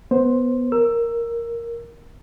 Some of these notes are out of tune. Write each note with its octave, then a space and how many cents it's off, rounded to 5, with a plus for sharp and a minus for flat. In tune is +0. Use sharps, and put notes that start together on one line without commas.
B3 +0 C5 +10
A#4 +0 E6 +15